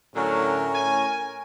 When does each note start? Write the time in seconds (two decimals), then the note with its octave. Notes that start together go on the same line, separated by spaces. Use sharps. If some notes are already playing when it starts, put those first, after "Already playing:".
0.16 A2 D3 F#3 C#4 A#4
0.75 G#5